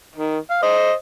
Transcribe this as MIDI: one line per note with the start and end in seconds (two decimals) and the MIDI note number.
0.15 0.38 51
0.50 0.60 77
0.63 0.92 72
0.63 0.92 75